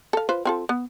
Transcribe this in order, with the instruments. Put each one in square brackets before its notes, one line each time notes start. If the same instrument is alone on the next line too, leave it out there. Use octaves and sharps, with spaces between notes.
[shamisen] A4 F5
F4 B4 C5
C4 F4 A4
B3